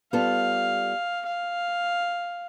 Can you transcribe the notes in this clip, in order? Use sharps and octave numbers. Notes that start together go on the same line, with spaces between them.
G3 B3 F4 A4 F5
F5